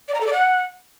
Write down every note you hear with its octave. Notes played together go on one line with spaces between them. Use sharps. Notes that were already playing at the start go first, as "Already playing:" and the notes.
D5
A#5
A4
D5
F#5